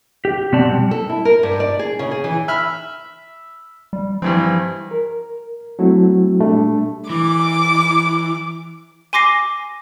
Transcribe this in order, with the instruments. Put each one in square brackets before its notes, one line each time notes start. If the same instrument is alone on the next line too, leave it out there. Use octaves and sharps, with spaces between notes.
[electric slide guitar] G4
B2 B3 C4 D5 A5
G3
[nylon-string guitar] A4
E4
A#4
G2
D5
G#4
C#3
G#4
E3
[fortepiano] E5 B5 F6
[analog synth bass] G3
[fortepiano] G2 E3 C4 [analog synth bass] F3
[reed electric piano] A#4
F#3 A3 C4 E4 F#4
A#2 G3 A3 D4
[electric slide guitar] E3 [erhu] D6
[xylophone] G#5 C6 D6 A#6 C7